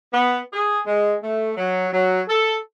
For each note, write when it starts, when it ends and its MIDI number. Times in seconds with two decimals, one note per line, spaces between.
0.12 0.39 59
0.52 0.80 68
0.87 1.15 56
1.24 1.51 57
1.57 1.87 54
1.92 2.20 54
2.28 2.55 69